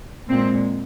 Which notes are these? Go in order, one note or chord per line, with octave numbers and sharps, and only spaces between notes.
A#2 G#3 C4